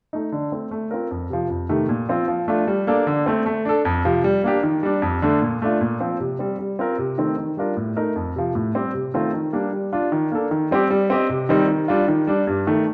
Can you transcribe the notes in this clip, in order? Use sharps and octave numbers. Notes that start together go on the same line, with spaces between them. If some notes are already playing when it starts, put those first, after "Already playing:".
A3 D#4
D3
A3 C4
A3
C4 F4 A#4
F2
C3 F3
F2
C3 D#3 A3
A#2
F3 C4 F4
F3
A3 D4 F4
G3
A#3 D4 A4 D5
D3
A3 C4
A3
D4 A4
F2
C3 F3
G3
A#3 D4 G4
D#3
G3 D4
F2
D3 A3 D4
A#2
A3 D4 F4
A#2
F3 C4
C3
G3 C4
G3
C4 F4 A#4
C3
D#3 A3 C4
D#3
G3 D4 F4 A#4
A2
A3 D#4 A#4
F2
C3 F3
A2
G3 C4 G4
C3
D#3 A3 C4 F4
D#3
G3 A#3 D4
G3
D4 F4
D#3
A#3 D4 A4
D#3
G3 C4 G4
G3
C4 G4 C5 D#5
C3
D#3 G3 C4 D#4
D#3
G3 D4 F4
D#3
G3 D4
G2
D#3 A3